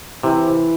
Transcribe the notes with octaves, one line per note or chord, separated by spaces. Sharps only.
C3 E3